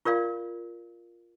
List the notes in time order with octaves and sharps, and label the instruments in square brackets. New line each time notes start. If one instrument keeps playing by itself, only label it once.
[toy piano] F4 A#4 D5 F5